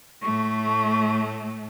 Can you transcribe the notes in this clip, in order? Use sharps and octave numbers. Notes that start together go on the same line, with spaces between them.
A2 A3 C#6